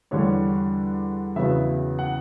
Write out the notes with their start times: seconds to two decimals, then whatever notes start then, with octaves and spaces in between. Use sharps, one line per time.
0.11 E2 D3 G3 D4 C#5
1.36 E2 C#3 F#3 B3 E5
1.99 F#5